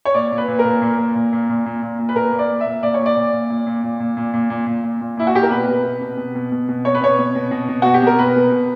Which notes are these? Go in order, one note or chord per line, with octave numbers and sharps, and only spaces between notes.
C#5
A#2 D5
A#2
B4
A#2
A#4
A#2
A#2
A#2
A#2
A#2
A#2
A#2
A#2
A#2
B4
A#2 A#4
A#2
D5
A#2
E5
A#2
A#2 D5
A#2 C#5
D5
A#2
A#2
A#2
A#2
A#2
A#2
A#2
A#2
A#2
A#2
A#2
A#2
A#2 E4
F#4
A#2 G4
A#4
B2 B4
B2
B2
B2
B2
B2
B2
B2
B2 C#5
B4
B2 C#5
B2
B2
B2
B2
B2 F#4
G4
B2 A#4
B2 B4
B2
B2